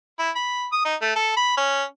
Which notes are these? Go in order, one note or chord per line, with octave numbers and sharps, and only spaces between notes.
E4
B5
D#6
D#4
A3
A4
B5
C#4